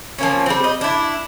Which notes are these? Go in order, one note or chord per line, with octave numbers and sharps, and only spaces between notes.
F3 A#3 C#4
G3 C4
D#5
D4 E4